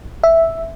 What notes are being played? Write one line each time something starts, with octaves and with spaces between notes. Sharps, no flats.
E5